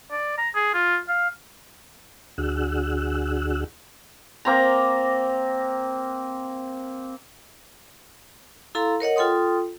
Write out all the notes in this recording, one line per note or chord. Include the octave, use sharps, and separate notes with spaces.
D5
A#5
G#4
F4
F5
D2 D4 F#4 G#4 E6 F#6
A#3 C4 A#5
E4 A4 F5 A#5 C6
A#4 C#5 D#5 F#5
F4 A4 G5 C6 D#6